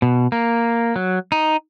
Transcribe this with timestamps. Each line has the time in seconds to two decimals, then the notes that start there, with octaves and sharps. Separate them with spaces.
0.02 B2
0.32 A#3
0.96 F#3
1.32 D#4